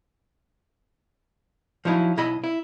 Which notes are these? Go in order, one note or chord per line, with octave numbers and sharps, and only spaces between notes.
F3 F#3 D#4 E4
B1 E4 D#5 B5
E4